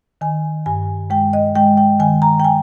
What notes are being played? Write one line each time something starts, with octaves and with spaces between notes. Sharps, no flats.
D#3 G#5
G2 G#5
G#3 G5
D#5
G#3 G5
G5
D#3 G#5
A#5
G5
G#5